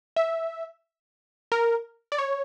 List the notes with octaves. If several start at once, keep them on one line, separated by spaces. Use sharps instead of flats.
E5
A#4
D5
C#5